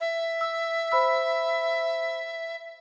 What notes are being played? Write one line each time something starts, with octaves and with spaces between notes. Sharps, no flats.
E5
E6
C5 B5 E6